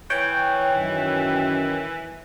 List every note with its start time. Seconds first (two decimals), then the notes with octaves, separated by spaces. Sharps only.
0.10 E3 C#5 G5
0.76 F#2 D#3